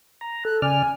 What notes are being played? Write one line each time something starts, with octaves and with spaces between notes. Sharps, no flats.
A#5
A4 F#6
C#3 D5 G#5 F6